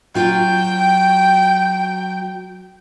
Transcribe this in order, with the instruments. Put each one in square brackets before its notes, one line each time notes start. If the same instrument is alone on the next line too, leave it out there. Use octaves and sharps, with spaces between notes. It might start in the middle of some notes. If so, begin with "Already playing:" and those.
[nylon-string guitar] F#3 F4 [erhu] G5